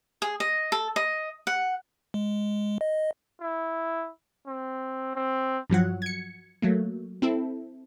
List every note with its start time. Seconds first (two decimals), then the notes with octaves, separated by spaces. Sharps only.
0.22 G#4
0.40 D#5
0.72 A4
0.96 D#5
1.47 F#5
2.14 G#3
2.81 D#5
3.40 E4
4.47 C4
5.15 C4
5.70 G2 F3 F#3 F#5
6.02 G#6 C#7
6.62 F#3 A3 A#3
7.22 C4 E4 A4